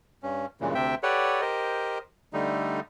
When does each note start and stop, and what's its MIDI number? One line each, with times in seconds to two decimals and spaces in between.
0.23 0.46 43
0.23 0.46 61
0.61 0.74 43
0.61 0.74 46
0.61 0.74 49
0.61 0.74 52
0.61 0.74 56
0.75 0.95 38
0.75 0.95 48
0.75 0.95 60
0.75 0.95 76
0.75 0.95 79
1.03 1.41 67
1.03 1.41 69
1.03 1.41 71
1.03 1.41 73
1.03 1.41 74
1.03 1.41 78
1.41 1.98 67
1.41 1.98 70
1.41 1.98 72
1.41 1.98 75
2.33 2.80 50
2.33 2.80 55
2.33 2.80 57
2.33 2.80 63